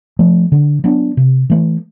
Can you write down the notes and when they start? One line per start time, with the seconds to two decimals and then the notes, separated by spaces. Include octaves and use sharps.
0.19 F3 A3
0.52 D3
0.84 F#3 B3 D4
1.17 C3
1.50 E3 A3